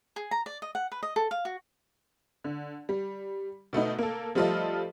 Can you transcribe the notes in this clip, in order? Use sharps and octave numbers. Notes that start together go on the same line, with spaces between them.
G#4
A#5
D5
D#5
F#5
B4
D#5
A4
F5
F#4
D3
G3
B2 A3 B3 D#4
A#3 A4
F3 G3 A3 F4 A4 D#5